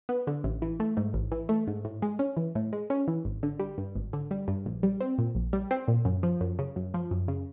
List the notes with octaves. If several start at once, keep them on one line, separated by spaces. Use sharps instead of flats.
B3
D3
A1
E3
A3
G#2
A1
E3
A3
G#2
A2
G#3
C#4
E3
A2
G#3
C#4
E3
G#1
D3
G3
G2
G#1
D3
G3
G2
A#1
G3
C4
A#2
A#1
G3
C4
A#2
F#2
F3
F#2
C#3
F#2
F3
F#2
C#3